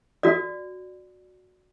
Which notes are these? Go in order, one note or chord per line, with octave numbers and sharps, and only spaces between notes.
F#4 D5